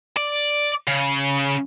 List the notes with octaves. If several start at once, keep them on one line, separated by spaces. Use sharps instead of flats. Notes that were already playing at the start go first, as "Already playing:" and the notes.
D5
C#3